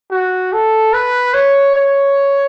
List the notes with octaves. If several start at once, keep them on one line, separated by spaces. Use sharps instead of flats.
F#4
A4
B4
C#5
C#5